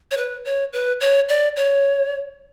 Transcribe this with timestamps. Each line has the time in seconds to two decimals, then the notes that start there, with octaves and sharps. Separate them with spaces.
0.11 C#5
0.17 B4
0.45 C#5
0.73 B4
1.01 C#5
1.29 D5
1.56 C#5